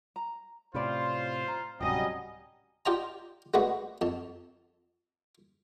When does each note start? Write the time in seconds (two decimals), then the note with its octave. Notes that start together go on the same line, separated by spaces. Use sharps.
0.16 A#5
0.74 A2 C3 C#4 F4 B4 C5 D5
1.48 A#5
1.81 D1 G#2 C3 F#3 G3 C#4 G4 D#5
2.86 F4 G4 D5 D#5 A5 A#5
3.54 G#3 A3 B3 D4 F#4 B4
4.01 F2 A5